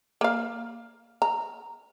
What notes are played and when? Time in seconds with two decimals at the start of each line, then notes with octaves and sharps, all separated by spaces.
0.21 A#3 F5
1.22 A#5